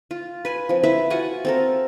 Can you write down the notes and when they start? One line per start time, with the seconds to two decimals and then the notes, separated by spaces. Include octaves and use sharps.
0.11 F4
0.45 B4 G#5
0.69 F3 C4
0.83 E4 B4 E5
1.10 F4 F#4 F#5 G#5
1.45 C4 A4 A#4